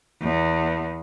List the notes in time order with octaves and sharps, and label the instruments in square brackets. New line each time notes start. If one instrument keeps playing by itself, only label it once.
[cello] E2